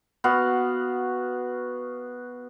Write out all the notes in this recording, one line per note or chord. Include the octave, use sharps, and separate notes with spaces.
B3 F#4 F5 F#5